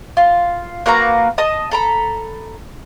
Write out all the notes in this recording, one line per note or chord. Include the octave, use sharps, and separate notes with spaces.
F4
A#3 F#4 B4 A#5
D#5 A5 D#6
A4 A#5 B5